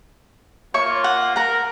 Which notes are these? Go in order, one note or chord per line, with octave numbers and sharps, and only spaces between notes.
A#3 F4 C#5 E5 C#6
F#5
A#4 F#5 A#5